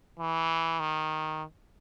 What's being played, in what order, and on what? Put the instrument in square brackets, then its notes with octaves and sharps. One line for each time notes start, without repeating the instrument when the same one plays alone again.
[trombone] E3
D#3